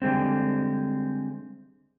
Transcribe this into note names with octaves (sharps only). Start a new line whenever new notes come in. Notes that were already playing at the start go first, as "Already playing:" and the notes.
D3 G3 G#3 C4